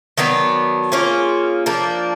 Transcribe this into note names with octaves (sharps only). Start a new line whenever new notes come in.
D#3 F#3 B3 D4
A#3 C#4 F4 G#4
F3 A#3 D4